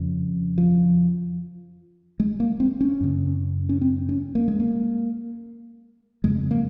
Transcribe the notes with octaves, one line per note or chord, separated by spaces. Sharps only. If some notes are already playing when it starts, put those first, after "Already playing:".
Already playing: F2 C#3
F3
G#3
A#3
C4
C#4
F#2 C#3
C#4
C4
C#4
A#3
G#3
A#3
F2 C#3 G#3
A#3